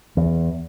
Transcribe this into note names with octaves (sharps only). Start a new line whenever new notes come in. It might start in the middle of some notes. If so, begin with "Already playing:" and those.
E2